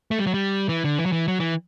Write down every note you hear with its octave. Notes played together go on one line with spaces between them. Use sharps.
A3
G3
F#3
G3
E3
D3
E3
F#3
E3
F#3
E3